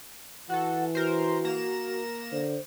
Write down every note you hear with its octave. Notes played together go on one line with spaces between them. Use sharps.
E3 F#4 A4 F#5
F#4 A#4 C5
A#3 A#5 E7
D3 C5